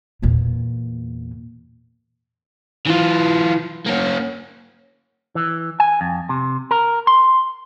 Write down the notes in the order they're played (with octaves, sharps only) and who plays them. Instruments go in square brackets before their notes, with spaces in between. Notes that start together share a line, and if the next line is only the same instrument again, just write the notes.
[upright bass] E2 A#2
[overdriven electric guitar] E3 F4
A#3 C#4
[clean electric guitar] E3
G#5
F2
C3
A#4
C6